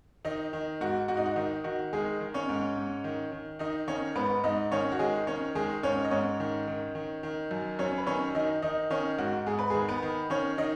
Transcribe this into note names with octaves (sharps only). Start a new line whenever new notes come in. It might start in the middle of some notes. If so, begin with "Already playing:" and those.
D#3 D#4 D#5
D#3
G#2 F#4
G#2 F#4
D#4
F#4
D#3 D#4
D#3 F#4
D#3 G#3 G#4
D#3
C#4 C#5
G#2
G#2
D#3
D#3
D#3 D#4 D#5
D#3 C#4 C#5
G#2 B3 B4
G#2 D#4 D#5
D#3 C#4 C#5
F#4
D#3 G#3 G#4
D#3 C#4 C#5
D#3 G#3 G#4
G#2 C#4 C#5
D#5
G#2 C#4 C#5
D#3
D#3
D#3
D#3
F#2
F#2 C#4 C#5
B4
D#3 C#4 C#5
D#3 D#4 D#5
D#3 D#4 D#5
D#3 C#4 C#5
G#2 F#4
G#2 G#4
B4
D#3 G#3 G#4
B3 B4
D#3
D#3 C#4 C#5
D#3 D#4 D#5